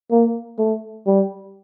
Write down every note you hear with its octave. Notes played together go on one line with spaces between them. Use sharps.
A#3
A3
G3